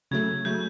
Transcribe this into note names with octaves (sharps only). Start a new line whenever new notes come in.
C#3 F#3 A3 G#6
C#3 F#3 A3 G6